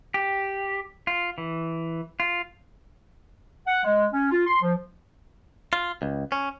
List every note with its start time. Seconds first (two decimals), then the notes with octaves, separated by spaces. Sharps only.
0.14 G4
1.07 F4
1.38 E3
2.20 F4
3.67 F#5
3.84 G#3
4.13 C#4
4.31 F4
4.47 C6
4.62 F3
5.73 F4
6.02 C#2
6.32 C#4